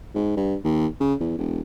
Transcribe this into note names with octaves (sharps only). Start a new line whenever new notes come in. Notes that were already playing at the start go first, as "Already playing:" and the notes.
G#2
G2
D#2
C#3
E2
E1